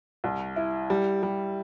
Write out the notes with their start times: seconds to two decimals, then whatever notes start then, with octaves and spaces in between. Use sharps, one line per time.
0.24 C2
0.56 E4
0.90 G3
1.23 G3